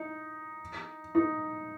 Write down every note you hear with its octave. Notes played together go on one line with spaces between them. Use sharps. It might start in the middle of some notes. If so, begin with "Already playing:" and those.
Already playing: D#4
D#4